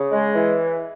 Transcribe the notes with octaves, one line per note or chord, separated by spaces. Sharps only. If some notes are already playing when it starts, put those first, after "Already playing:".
Already playing: C#3
G#3
E3